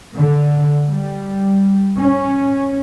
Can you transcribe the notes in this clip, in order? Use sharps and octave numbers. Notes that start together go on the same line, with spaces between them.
D3
G3
C#4